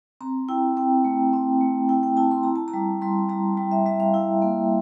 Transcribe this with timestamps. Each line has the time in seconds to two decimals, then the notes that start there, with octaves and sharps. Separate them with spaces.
0.21 C4 A#5
0.49 E4 G5
0.77 C4 G5
1.04 A3
1.33 C4
1.61 A3
1.89 E4 G5
2.03 G5
2.17 E4 A5
2.31 C6
2.43 E4 A#5
2.56 A5
2.68 A#5
2.74 G3
3.02 G3 C6
3.29 G3 A#5
3.57 G3 G5
3.71 E5
3.86 G3 E5
4.00 F5
4.14 E4
4.42 A#3